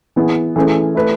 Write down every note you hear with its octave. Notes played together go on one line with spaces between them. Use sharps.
E3 B3 E4 G#4
E3 A3 C#4 G#4 B4
A3 E4 B4